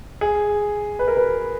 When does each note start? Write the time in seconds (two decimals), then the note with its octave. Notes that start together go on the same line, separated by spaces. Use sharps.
0.21 G#4
0.99 B4
1.08 A#4
1.17 B4